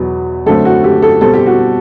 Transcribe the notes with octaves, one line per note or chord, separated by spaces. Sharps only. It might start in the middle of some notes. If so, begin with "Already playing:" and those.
Already playing: E2 B2 F#3 B3
F#2 D3 A3 C4 A4
F#4
G4
A4
B2 G3 C4 A4
G4
F#4